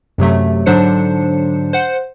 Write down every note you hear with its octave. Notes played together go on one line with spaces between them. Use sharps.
F#2 C3 F#3 A3
G#2 D3 F#3 D4 C5 C#7
C5 F#5